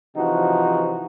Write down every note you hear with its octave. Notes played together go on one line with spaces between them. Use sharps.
C3 E3 F3 D#4 F#4